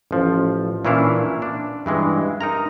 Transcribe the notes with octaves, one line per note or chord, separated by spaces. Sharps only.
A1 F3
A#2 E3 C#4 D4 E4 F5
D4
G2 E3 G#3
D#4 A#4 A#5